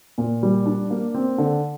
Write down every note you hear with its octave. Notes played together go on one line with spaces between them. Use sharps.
A#2
G3
D4
A#3
C4
D3